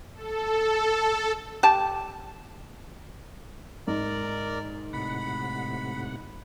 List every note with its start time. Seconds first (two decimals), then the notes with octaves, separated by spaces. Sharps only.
0.14 A4
1.63 G4 A5
3.87 G#2 A#4 D5
4.93 A2 C3 F#5 B5